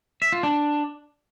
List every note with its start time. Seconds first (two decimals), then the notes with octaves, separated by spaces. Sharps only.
0.22 E5
0.32 F4
0.43 D4